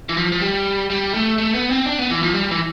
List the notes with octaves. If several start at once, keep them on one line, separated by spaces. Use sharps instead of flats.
E3
F3
F3
G3
G3
A3
A3
B3
C4
D4
B3
E3
F3
G3
E3